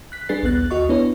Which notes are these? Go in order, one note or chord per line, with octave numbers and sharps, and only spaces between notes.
F#6 B6
G3 D4 G#4 B4 A6 C7
A#1 D#2 B3 F#6 A6
D#2 F#4 D#5 C#6
B3 D4 E4 B4 C#5